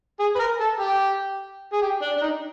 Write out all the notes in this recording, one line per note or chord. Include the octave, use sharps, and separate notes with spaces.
G#4
B4
A#4
A4
G4
G#4
G4
D4
D4
D#4